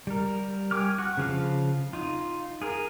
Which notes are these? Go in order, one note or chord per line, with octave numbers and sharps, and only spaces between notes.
G3 A#4
G5 G#5 C#6 D6 F6
F#4
C#3 F3 F5
D#4 F4
G#4 A#4